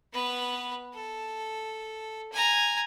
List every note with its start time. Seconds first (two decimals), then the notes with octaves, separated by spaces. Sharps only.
0.13 B3 B4
0.94 A4
2.32 G#5 A#5